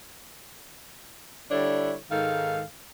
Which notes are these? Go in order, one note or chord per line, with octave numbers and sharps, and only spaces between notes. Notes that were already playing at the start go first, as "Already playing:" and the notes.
D3 G3 D4 E4 A4 C#5
G#2 D#3 G#3 A4 F5